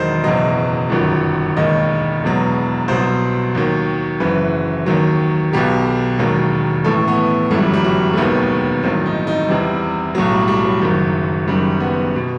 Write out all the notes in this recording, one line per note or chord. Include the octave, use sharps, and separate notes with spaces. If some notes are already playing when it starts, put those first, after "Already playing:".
Already playing: E1 E2 D#3 F#3 C5 D#5
F#1 E2 B2 F#3 D#5
G1 F#2 D#3 F#3
E1 D#2 D#3 D#5
E1 E2 B2 F#3
C2 B2 F#3 C5
D#2 D#3 F#3
F#1 F#2 E3 B4
D#2 D#3 F#3
B1 B2 F#3 G4
E1 D#2 D#3 F#3
A1 A2 E3 A4
B3
G1 F#2 E3 A3
G3
F#3
G3
F#3
A3
E1 D#2 D#3 F#3 B3
A1 G2 D#3 F#3 C4
D#4
D#4
E2 C3 E3 G3
B1 A2 F#3
G3
G3
F#3
F#1 F#2 D#3
F#1 F#2 D#3 G3
B3
B2